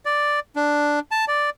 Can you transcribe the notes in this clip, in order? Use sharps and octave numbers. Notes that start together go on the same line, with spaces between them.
D5
D4
A5
D5